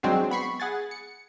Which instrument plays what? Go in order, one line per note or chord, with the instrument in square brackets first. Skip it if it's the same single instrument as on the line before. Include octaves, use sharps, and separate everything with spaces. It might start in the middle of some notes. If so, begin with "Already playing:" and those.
[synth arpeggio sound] F#3 G#3 C4 D4 F#4 G#4
B3 B5 C#6 C7
G#4 F#5 G#5 A6
C#7